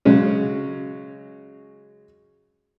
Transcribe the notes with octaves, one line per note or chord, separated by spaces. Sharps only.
C#3 F#3 G#3 C#4